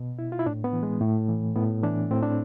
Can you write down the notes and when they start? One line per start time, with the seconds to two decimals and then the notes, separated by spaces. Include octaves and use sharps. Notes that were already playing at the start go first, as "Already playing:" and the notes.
Already playing: B2
0.19 E4
0.32 F4
0.39 E4
0.46 A2 D4
0.64 B3
0.73 E3
0.83 G#3
1.01 A2 A3
1.29 E3
1.56 A2 B3
1.83 E3 D4
2.11 A2 C4
2.22 D4